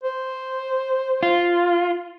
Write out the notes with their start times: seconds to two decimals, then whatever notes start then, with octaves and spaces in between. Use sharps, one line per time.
0.04 C5
1.23 F4